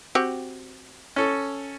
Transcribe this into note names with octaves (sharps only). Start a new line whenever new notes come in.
C4 F#4 G4
C#4 A4